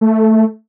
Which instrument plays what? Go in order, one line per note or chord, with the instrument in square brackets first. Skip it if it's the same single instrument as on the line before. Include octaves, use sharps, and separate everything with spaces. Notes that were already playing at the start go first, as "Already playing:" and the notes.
[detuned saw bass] A3